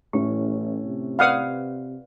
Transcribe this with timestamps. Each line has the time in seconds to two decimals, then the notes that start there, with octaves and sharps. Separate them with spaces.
0.13 A1 A2 C#4 G4
0.84 C3
1.19 F4 B4 D5 F5 F#5 D#6